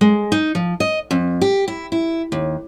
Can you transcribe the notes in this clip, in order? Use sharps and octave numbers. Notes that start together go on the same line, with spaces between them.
G#3
D#4
F3
D#5
F2
G4
E4
E4
D#2